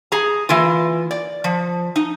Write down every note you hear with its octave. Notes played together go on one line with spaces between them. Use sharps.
G#4 A#5
E3 A#3 F4
D5
F3
D#4